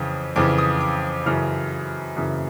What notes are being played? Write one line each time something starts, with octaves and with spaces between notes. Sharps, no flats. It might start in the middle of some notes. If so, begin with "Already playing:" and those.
Already playing: F2 C#3 E3
F2 C#3 E3 D6
D#6
D6
F#2 C#3 E3 F6
F#2 C#3 E3